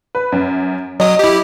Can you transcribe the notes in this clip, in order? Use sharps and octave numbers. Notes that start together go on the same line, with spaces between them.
B4
F#2
F#3 D#5 D#6
E4 G4